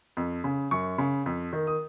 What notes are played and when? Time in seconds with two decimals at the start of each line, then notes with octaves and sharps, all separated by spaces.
0.17 F2
0.44 C#3
0.71 F#2 C#6
0.98 C#3
1.26 F2
1.53 D#3
1.67 D#6